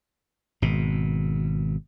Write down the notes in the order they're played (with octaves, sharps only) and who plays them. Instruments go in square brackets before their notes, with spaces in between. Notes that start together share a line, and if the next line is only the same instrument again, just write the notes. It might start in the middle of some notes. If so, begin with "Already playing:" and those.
[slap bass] G#1 B2